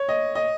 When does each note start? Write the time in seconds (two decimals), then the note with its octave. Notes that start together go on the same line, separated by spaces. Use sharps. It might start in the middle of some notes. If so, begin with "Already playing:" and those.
Already playing: C#5
0.09 D#5
0.35 D#5